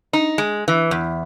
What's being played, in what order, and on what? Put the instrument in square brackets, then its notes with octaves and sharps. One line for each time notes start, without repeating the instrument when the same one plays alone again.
[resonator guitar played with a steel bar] D#4
G#3
E3
E2